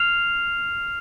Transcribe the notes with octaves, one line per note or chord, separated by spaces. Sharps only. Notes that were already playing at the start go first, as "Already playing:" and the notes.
Already playing: F6 C7 F7